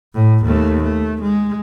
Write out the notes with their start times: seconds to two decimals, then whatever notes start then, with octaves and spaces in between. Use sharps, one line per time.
0.14 A2
0.45 D#2 A3
0.83 A3
1.21 G#3